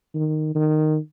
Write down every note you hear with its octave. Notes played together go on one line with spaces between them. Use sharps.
D#3
D#3